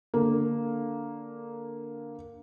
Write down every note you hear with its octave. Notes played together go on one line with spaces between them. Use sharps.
D3 A#3